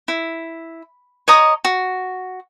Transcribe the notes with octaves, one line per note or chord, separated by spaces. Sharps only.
E4
C#5 D#5 A#5 D#6
F#4